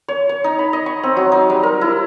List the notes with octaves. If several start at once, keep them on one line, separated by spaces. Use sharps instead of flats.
C#5
C#5
D#4
B5
D#5
C#6
C4
F#3
D#4
G3
A#4
E4